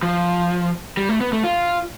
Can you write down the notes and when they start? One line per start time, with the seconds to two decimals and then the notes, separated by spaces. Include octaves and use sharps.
0.03 F3
0.97 G3
1.09 A3
1.21 B3
1.33 A3
1.44 F4